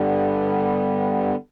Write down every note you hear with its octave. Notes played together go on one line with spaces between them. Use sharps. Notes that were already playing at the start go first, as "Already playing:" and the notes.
Already playing: G2 D3 G3 B3